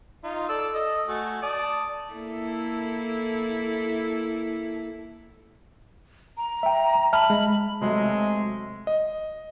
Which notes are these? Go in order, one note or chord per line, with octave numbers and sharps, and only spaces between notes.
D#4 F4
A4 D5 E6
A4 D#5
A3 F#4 G#5
D5 A5 D#6
A#3 E4 A4
A#5
E5 G5
E5 A5 B5 F6
G#3
C3 F#3 G#3 A3
D#5